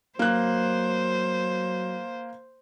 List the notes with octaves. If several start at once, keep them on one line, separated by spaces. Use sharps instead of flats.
F#3 A#3 C5 F#6